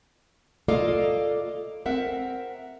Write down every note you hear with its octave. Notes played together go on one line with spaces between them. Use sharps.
A#3 F4 A4 D5 D#5 F5
C4 A#4 E5 F#5